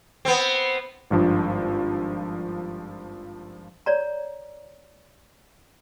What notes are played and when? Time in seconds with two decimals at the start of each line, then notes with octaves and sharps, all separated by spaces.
0.25 B3 C4
1.10 G#1 G2 F3 D4
3.86 C#5 D5 A#5